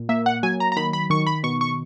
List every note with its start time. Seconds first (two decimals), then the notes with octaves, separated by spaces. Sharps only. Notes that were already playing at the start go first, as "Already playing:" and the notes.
Already playing: A#2
0.09 A#3 E5
0.26 F#5
0.43 F#3 G#5
0.60 A#5
0.72 A#5
0.77 D#3 B5
0.93 B5
1.10 D#3 C#6
1.27 B5
1.43 B2 C#6
1.61 C#6